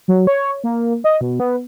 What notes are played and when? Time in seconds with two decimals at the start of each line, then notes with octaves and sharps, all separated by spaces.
0.08 F#3
0.27 C#5
0.64 A#3
1.04 D#5
1.21 B2
1.40 B3